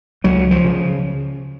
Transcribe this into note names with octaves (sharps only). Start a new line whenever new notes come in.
C#2 F#3
F3
C#3